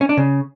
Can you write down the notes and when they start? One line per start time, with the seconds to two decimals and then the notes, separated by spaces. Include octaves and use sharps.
0.01 C#4
0.09 D4
0.17 C#3